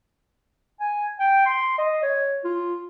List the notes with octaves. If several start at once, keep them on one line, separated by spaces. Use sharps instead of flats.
G#5
G5
C6
D#5
C#5
F4